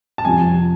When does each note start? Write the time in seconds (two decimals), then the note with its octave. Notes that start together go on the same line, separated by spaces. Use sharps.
0.18 A5
0.25 F2 C3 F3 G#5